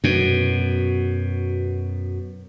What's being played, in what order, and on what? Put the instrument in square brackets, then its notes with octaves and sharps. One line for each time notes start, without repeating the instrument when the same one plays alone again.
[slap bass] F#2 B2